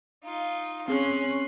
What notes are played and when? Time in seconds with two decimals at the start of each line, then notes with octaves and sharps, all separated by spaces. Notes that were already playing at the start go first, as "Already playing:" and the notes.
0.24 D#4 F4
0.88 C4 C#4 G#4 C6 F#6